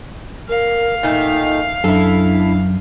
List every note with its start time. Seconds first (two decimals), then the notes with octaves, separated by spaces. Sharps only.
0.49 A#4 F5
1.03 A#2 D#3 A3 D#4
1.84 F#2 D4 E4 A4